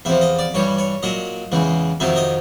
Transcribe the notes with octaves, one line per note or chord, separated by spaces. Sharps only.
E2 C3 F3 E5
D#5
D5
G2 E3 G3 C#5
C#5
A#2 F#3 D#5
E2 C#3 E3 G#3
F2 C3 D#3 F#3 E5
D#5